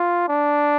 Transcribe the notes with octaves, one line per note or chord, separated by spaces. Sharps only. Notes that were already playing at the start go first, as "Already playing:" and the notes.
Already playing: F4
D4